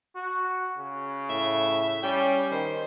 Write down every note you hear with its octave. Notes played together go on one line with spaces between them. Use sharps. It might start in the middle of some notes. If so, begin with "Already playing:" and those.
F#4
C#3
A2 E5
G3 C#4 G5
D#3 C5